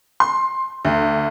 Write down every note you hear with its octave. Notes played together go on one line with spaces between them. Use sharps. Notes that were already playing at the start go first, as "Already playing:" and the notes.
C6
D2